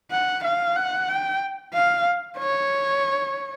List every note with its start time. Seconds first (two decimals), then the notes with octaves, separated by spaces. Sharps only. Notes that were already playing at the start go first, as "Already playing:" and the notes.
0.11 F#5
0.44 F5
0.76 F#5
1.08 G5
1.74 F5
2.38 C#5